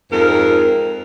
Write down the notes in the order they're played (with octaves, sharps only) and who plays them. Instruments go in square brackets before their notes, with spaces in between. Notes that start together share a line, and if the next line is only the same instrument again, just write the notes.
[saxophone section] F2 G#2 A#4